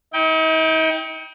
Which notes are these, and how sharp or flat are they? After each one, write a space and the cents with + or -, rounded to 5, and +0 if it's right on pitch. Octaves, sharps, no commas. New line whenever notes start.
D#4 +45 G5 +0